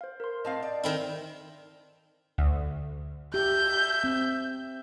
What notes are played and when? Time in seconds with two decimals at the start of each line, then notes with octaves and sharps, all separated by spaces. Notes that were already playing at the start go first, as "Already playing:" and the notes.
0.01 C5 F5
0.20 A#4 C6
0.45 A2 C4 D#5 F5 A5
0.63 D5
0.83 D#3 C4 E4
2.38 D2
3.34 G4 E5 G6
4.04 C4